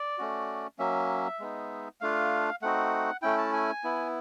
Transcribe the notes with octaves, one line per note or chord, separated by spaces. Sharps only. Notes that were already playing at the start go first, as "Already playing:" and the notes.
Already playing: D5
A3 C#4 F#4
F#3 A#3 C#4 E5
G#3 B3 D#4
A3 D4 F4 F5
A3 C4 D#4 F#4 F#5
A3 C#4 E4 G5
A5
G#5
B3 E4